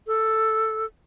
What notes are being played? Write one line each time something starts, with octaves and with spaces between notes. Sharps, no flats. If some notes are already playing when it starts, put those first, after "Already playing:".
A4